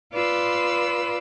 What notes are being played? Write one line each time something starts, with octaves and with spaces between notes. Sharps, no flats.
F4 B4 D5 B5 C6 E6